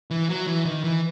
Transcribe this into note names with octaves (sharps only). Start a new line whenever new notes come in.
E3
F#3
E3
D#3
E3